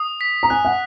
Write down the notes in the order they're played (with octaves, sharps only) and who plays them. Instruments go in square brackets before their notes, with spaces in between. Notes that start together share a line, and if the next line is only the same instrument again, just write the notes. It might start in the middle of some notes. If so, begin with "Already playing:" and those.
Already playing: [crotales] D#6
B6
[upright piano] A#5
[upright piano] G#5 [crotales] F#6
[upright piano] F#5